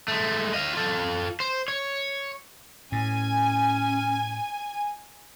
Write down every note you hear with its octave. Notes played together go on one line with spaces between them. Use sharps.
G#3 A3
D#5 F5
F4 A4
C5
C#5
A2 C#4 G#5